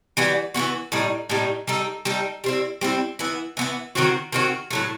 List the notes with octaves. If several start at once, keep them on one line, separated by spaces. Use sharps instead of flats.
E3 G3 B3 F#4
E3 G3 B3 F#4
A2 G3 D#4
A2 G3 D#4
G3 D#4 A4
G3 D#4 A4
G3 C4 E4
G3 C4 E4
E3 B3 E4
E3 B3 E4
D#3 F#3 C4 F#4
D#3 F#3 C4 F#4
A2 F#3 A3